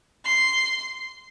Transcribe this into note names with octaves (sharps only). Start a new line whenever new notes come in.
C6